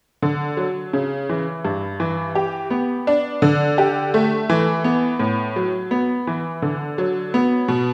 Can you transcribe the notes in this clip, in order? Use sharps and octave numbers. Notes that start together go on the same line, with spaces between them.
D3
F#3
C#3
E3
G2
E3
G4
B3
D4
D3
G4
A3
E3
B3
A2
F#3
B3
E3
D3
F#3
B3
B2